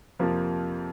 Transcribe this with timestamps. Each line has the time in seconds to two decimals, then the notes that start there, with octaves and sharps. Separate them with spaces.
0.19 F2 C3 F3 A#3 F4